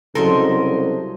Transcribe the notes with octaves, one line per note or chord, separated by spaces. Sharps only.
C2 C#3 F#3 A4 A#4 C5 D#5